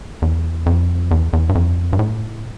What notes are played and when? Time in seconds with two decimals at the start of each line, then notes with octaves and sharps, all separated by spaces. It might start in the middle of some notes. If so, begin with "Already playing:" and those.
0.22 E2
0.66 F2
1.11 E2
1.33 E2
1.49 G2
1.55 F2
1.93 G2
1.99 A2